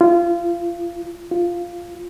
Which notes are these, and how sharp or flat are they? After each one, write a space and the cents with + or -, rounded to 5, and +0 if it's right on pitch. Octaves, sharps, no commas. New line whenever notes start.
F4 -25
F4 -5